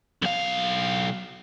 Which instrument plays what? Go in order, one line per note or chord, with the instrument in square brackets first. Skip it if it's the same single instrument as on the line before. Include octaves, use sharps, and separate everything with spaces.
[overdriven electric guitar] B1 F5